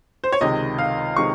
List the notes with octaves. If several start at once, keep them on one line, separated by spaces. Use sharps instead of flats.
C5
C#5
C#2 C3 D#3 G#3 D#5
F5
C3 D#3 G#3 C#6